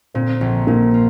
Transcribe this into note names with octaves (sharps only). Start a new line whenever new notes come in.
A#2 C4
A#1
A#2 A#3
F4